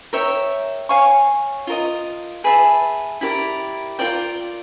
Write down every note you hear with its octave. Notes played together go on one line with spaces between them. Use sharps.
A#4 C#5 E5 G5
C#5 F5 G#5 C#6
F4 A#4 D#5
G#4 B4 E5 A5
E4 G4 A#4 D5
F4 A#4 D5 G5